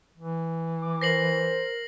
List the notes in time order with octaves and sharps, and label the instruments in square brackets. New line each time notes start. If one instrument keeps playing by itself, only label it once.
[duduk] E3
[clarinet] D6
[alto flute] A#4 [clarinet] C5 [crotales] A#6 C7 F#7